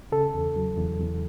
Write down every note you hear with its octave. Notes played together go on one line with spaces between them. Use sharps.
C#3 A4
E2
F#3
E2
E2